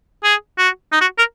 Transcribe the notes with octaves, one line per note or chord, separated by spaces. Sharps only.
G#4
F#4
D#4
F#4
A#4